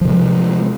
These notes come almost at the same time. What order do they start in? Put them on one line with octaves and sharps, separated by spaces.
F3 C3 G#3